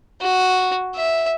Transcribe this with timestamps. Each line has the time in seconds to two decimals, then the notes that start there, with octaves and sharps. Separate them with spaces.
0.21 F#4
0.95 E5